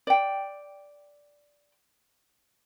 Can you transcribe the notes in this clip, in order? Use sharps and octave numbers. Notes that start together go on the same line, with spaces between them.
D5 G5